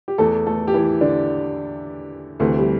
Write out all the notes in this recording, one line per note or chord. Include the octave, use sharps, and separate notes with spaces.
G4
E2 E3 A3 A4
A3 A4
G4
E3 E4
D3 D4
D2 C3 E3 A3
G3